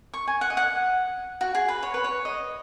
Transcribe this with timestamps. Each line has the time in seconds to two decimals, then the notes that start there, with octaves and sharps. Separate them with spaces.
0.14 C#6
0.28 G#5
0.41 F#5
0.50 D#5
0.57 F#5
1.41 F#4
1.55 G#4
1.68 B4
1.83 C#5
1.94 B4
2.04 C#5
2.25 D#5